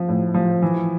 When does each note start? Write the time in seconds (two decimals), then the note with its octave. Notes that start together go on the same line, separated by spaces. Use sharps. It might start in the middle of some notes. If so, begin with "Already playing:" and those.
Already playing: F3
0.08 A2
0.34 F3
0.62 E3